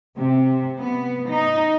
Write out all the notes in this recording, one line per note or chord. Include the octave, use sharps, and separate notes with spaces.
C3
B3
D#4